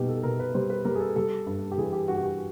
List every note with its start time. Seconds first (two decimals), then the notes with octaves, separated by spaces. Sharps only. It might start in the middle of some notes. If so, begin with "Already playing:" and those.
Already playing: B2 G3 D#4 G4
0.09 A4
0.23 B2 A#4
0.39 B4
0.55 G3 C5
0.70 B4
0.85 G3 A#4
0.95 G#4
1.00 A4
1.16 G3 A4
1.46 G2
1.72 G4
1.78 E3 G#4
1.93 G4
2.08 G2 F#4
2.17 G4
2.23 F#4